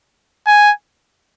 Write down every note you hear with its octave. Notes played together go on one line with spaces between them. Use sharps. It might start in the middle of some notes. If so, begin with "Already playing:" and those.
G#5